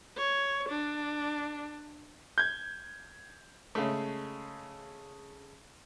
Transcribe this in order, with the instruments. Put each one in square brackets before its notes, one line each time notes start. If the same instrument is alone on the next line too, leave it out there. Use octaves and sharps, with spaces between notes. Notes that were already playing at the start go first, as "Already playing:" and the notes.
[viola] C#5
D4
[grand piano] G6 G#6
[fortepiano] C#3 G#3 A3